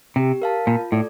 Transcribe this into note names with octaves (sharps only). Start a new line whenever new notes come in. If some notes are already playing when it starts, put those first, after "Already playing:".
C3 G4
A#4 F5 A5
A#2 F4
A2 A4 D5